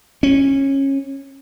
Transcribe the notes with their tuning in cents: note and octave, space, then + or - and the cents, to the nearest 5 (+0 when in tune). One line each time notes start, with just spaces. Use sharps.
C#4 -20